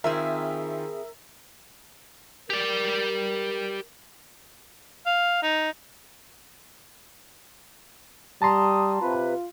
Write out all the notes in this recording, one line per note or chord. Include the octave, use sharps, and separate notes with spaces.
D#3 C4 E4 F4 G#4 A#4 E5
G4 A#4 D5
F5
D#4
G3 A5 A#5 C6 D#6
C3 F4 B4